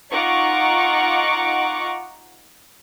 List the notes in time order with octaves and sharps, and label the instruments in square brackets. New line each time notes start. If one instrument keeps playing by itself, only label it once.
[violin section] D#4 F4 F#5 A#5 C#6 D6